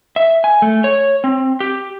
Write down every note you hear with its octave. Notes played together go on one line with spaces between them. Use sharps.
E5
G#5
A3
C#5
C4
G4